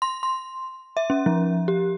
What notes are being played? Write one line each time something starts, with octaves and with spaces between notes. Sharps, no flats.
C6
C6
E5
C#4
F3
G4